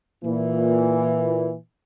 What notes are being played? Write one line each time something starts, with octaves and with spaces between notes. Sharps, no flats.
A#2 E3